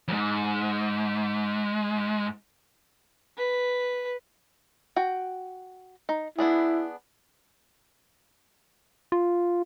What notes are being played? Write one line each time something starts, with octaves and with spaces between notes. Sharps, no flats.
F2 G#2
B4
F#4 G5
D#4
B3 D4 E4 G#4
F4